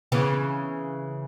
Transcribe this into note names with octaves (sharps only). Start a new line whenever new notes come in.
C#3 E3 B3